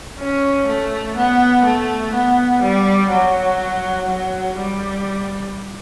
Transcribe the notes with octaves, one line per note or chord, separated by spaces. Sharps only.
C#4
A3
B3
A3
B3
G3
F#3
F#3
G3